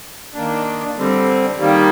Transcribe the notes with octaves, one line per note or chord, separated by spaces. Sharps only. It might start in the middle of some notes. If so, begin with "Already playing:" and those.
D#3 A#3 D4
D3 G3 C4
D#3 G3 A#3